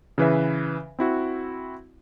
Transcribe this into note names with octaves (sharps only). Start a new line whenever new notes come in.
C#3 E3 B4 E5
C4 E4 F#4